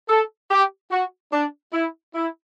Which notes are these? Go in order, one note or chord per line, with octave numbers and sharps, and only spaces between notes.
A4
G4
F#4
D4
E4
E4